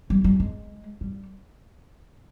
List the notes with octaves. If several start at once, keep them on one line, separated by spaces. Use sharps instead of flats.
G3
G3
G#3
G3